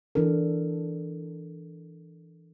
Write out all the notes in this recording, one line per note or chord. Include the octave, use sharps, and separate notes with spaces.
E3 D4 A4 A#4